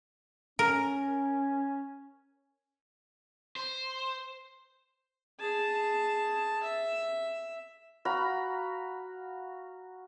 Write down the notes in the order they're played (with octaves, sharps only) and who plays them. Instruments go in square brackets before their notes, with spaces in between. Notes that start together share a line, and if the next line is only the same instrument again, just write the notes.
[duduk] C#4 [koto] A#4
[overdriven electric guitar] C5
[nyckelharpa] G#4 A5
E5
[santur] F#4 F5 A#5 B5